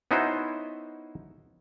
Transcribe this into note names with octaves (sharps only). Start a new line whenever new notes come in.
B3 C#4 D#4 E4 F#4 C5